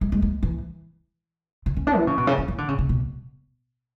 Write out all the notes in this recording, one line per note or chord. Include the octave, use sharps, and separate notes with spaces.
G#3
G#3
G#3
E3
D3
C#4
D4
E3
C#3
B2
C#3
E3
E3
D3
C#3
C#3
B2